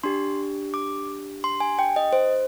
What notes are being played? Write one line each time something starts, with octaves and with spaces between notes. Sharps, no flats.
D4 G4 C6
D6
C6
G#5
G5
D#5
C5